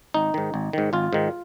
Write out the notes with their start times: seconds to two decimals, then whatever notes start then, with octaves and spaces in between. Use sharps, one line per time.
0.14 G#1 D#4
0.34 G#2 D#3
0.54 G#1
0.73 G#2 D#3
0.93 G#1 F4
1.13 G#2 D#3